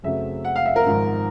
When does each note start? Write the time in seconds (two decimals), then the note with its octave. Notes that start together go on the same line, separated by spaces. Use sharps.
0.03 F#2 C#3 F#3 A3 C4 E5
0.45 F#5
0.56 F5
0.66 E5
0.76 A#4
0.86 G#1 G#2 F3